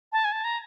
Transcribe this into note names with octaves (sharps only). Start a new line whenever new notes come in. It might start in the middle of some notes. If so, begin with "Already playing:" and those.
A5
G#5
A5
A#5